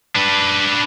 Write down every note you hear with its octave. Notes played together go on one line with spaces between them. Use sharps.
D4 B4